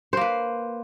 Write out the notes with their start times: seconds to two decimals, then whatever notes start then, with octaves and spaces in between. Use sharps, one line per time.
0.13 C5
0.17 A#3
0.21 B4